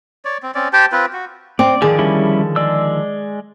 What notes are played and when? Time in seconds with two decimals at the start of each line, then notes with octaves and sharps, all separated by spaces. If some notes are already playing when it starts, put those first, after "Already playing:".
0.25 C#5 D5
0.43 C4
0.55 C4 C#4 D5
0.73 G4 C5 G5 A5
0.92 C4 F4 B4
1.13 F#4
1.59 C4 D5
1.82 D3 D#3 F3 G#4
1.99 G3 C#4 E4
2.56 G#3 D5 E6